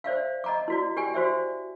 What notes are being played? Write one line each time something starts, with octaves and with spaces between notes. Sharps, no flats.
C5 D5 E5 F5
D#5 A#5 D6
E4 F#4 D5
G4 D5 G5 G#5
F#4 C5 D5 E5